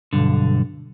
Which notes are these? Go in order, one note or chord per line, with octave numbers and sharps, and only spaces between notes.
B1 G2 D3